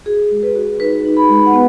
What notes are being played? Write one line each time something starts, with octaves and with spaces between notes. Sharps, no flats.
F#4 G#4
G#3
B4
F#4
D#4 B4
D#4
B5
G#3
F#5
B3